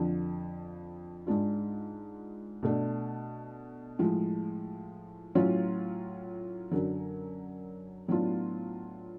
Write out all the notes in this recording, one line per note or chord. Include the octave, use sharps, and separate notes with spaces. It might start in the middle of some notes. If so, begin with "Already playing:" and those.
Already playing: F2 D3 F3
G#2 G#3 D4 F4
B2 A3 D4
A2 F3 G#3
A2 F#3 C#4 F4
F#2 D3 F#3
A2 F#3 B3 D4 F4